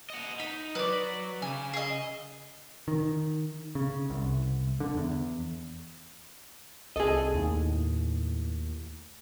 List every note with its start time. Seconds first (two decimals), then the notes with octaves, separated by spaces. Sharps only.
0.10 D#5 F#5
0.40 D#4 B5
0.75 F#3 B4 D5
1.42 C#3 G#5
1.74 G#4 D#5
2.88 D#3
3.75 C#3
4.10 C2
4.80 D3
4.94 E2
6.96 C2 G#4 A4 D#5
7.34 D#2 A2